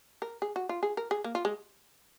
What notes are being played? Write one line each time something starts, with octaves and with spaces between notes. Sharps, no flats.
A#4
G#4
F#4
F4
G#4
A#4
G#4
A#3
F4
G#3